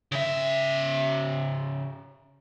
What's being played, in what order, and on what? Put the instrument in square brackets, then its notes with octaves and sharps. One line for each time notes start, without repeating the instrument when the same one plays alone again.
[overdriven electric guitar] C#3 E5